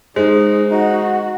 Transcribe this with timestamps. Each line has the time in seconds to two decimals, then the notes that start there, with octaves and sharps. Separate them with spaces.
0.16 G#3 D#4 C5
0.71 D#4 F#4